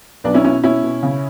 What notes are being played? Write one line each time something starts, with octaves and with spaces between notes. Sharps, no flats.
B1 B3 D4
C#4 E4
B2 C#4 E4
B2 C#4 E4
B2
C#3